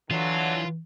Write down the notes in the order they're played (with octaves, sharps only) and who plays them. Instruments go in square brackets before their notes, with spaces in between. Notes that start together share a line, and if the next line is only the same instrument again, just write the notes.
[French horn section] D3 F#3 [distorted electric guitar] E3 [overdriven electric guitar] F4